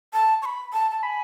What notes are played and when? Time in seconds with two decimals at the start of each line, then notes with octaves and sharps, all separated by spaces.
0.13 A5
0.42 C#6
0.45 B5
0.73 A5
0.91 A5
1.03 G#5 B5